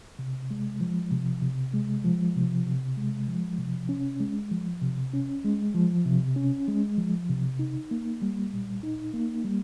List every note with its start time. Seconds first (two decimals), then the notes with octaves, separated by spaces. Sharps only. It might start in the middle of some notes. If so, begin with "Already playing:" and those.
0.19 C3
0.51 G#3
0.81 F3
1.11 C3
1.42 C3
1.74 G#3
2.04 F3
2.36 C3
2.66 C3
2.97 G#3
3.28 F3
3.58 C3
3.89 C#4
4.20 G#3
4.51 F3
4.82 C3
5.13 C#4
5.44 G#3
5.74 F3
6.06 C3
6.36 C#4
6.68 G#3
6.98 F3
7.30 C3
7.59 D#4
7.91 A#3
8.22 G3
8.53 A#2
8.83 D#4
9.14 A#3
9.44 G3